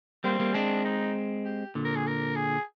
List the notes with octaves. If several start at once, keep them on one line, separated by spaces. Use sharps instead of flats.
G3 A#3 C4
G3 A#3
G#3 C4 D4
D#4
G4
A#2 D3
A#4
G#4
A#4
G#4